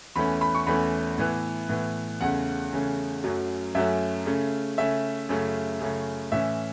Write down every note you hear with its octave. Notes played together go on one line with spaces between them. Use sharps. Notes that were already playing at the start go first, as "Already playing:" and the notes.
E2 E3 A3 C#4 B5
B5
C#6
E2 E3 A3 C#4 B5
A2 E3 B3
A2 E3 B3
E2 C#3 A3 C#4 F#5
E2 C#3 A3 C#4
F#2 F#3 A3 C#4
F#2 F#3 A3 C#4 E5
C#3 A3 C#4
C#3 A3 C#4 E5
F#2 C#3 A3 C#4
F#2 C#3 A3 C#4
A2 E3 C#4 E5